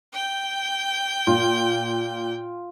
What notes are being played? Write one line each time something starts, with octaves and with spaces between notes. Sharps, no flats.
G5 G6
A#2 F4